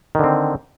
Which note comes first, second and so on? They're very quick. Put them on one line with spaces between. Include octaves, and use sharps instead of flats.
D#3 D3 C4